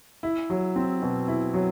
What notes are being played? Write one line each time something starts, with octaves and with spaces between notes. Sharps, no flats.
E4
F#3
C4
B2
E4
F#3